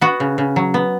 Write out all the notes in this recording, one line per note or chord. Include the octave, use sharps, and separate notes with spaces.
B3 F#4
C#3
C#3
F#3
B3